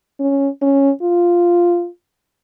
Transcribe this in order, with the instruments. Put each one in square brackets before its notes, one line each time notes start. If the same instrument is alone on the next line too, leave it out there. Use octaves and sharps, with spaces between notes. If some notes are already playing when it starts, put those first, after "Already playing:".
[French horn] C#4
C#4
F4